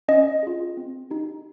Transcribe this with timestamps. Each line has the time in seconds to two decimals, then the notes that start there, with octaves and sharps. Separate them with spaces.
0.08 C#4 D#5
0.43 F4 G#4
0.77 C4
1.10 D#4 G4